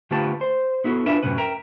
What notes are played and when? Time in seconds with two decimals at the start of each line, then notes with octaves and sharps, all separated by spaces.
0.11 D3 A3 F4 G4 B4 A5
0.41 C5
0.84 B3 E4 F#4 A4
1.06 D4 F4 B4 E5
1.23 F#2 A2 C3 C#4 B4
1.38 A#4 E5 G5 A#5